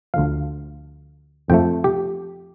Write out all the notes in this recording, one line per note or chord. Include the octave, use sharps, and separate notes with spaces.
D2 D3 F3 F5
F2 F3 A3 G5
G4